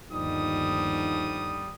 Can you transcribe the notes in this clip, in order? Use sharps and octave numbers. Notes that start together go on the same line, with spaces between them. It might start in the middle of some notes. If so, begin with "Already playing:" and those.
G1 D#2 D3 F3 G3 D#4 D#6